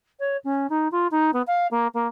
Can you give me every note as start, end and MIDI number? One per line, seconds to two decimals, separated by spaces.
0.19 0.37 73
0.44 0.67 61
0.69 0.88 63
0.91 1.07 65
1.11 1.31 63
1.33 1.42 59
1.47 1.67 77
1.71 1.87 58
1.94 2.07 58